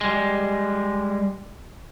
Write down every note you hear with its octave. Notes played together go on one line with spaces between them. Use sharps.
G3 G#3